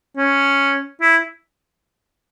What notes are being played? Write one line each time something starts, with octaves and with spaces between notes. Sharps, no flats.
C#4
E4